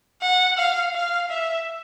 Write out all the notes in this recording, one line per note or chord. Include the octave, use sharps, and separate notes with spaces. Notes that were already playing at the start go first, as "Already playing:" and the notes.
F#5
F5
F5
E5